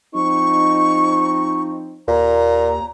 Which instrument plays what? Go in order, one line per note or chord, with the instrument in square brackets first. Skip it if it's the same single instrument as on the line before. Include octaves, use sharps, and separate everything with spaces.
[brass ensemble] F3 C4 D#4 [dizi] C#6
[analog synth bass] D#2 [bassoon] A#2 [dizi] A#5